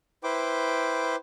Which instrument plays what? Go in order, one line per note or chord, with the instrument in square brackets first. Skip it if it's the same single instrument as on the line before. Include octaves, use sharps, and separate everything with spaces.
[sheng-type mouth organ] E4 B4 C5 G5 D6